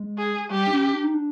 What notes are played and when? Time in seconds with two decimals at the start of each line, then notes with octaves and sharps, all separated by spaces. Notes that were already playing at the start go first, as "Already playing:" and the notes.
Already playing: G#3
0.18 G#4
0.50 G3 G4
0.67 D4
0.72 C#4
0.93 D4
1.04 D#4
1.14 D4